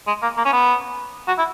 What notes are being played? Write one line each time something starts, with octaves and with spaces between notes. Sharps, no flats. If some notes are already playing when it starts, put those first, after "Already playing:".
G#3
A#3
A#3
C#4
B3
F#4
E4